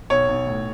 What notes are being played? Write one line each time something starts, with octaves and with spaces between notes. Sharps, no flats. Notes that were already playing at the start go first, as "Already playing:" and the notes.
B1 C#5
B1
A2